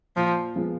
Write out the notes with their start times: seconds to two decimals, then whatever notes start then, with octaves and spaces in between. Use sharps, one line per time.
0.17 A#2 F3
0.56 F3 G#3 B3